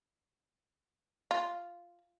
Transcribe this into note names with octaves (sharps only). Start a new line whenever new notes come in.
F4